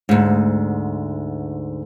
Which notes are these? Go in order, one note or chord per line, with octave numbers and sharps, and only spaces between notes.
D2 G#2